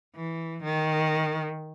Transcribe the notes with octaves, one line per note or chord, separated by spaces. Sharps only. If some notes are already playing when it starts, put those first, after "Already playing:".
E3
D#3